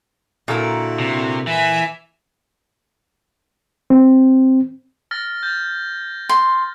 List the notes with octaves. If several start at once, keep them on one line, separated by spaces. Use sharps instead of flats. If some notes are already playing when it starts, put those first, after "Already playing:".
A#2 D3 E4 F#4 A4 A#4
C3
E3 E5 G#5
C4
F6 A6 A#6
G6 A6
C6